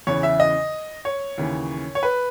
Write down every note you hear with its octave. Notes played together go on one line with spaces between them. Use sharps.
E2 C#3 E3 C#5
E5
D#5
C#5
D#2 C#3 E3
C#5
B4